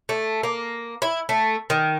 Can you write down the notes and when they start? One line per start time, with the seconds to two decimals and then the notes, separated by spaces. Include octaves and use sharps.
0.09 A3
0.43 A#3
1.02 E4
1.29 A3
1.70 D#3